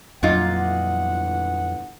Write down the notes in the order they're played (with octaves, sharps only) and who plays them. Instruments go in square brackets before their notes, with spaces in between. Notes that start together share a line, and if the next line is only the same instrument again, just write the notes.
[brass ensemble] G1 E3 F#5 [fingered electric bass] F2 F#3 [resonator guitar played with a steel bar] A#2 D#4 F4